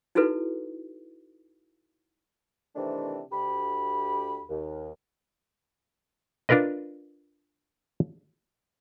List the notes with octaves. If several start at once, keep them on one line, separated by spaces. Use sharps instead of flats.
D#4 E4 F#4 A4 B4
C3 D#3 E3 A3 C4 D4
D2 G4 B5
D#2
D4 F4 A#4 B4 D#5